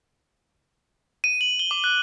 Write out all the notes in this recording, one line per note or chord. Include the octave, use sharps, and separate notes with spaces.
D#7
F#7
G7
D6
F#6